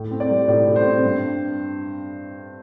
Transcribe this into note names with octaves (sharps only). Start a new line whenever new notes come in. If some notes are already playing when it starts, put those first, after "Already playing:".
Already playing: A2
C4
D5
G3
A2 D5
A2
C5
C4
G2